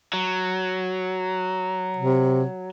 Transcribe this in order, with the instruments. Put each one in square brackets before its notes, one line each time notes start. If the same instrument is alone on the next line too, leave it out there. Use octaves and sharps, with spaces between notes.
[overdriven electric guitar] F#3
[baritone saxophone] C3